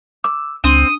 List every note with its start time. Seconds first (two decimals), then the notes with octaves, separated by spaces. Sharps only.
0.24 D6 E6
0.64 C#2 C4 D4 D#6 D#7 G7